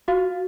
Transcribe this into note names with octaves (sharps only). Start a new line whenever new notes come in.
F4 F#4 F5